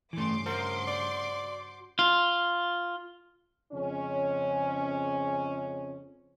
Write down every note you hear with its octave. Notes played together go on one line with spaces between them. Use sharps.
G2 C#3 E3 A3 C6 D6
F#4 A#4 C5
D5
F4
F2 C#3 F3 G#3 C#4